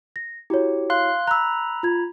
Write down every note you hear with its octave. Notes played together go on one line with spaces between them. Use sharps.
A#6
E4 F#4 G4 C#5
F5 C6 F#6
A#5 B5 E6 F#6
F4 G#6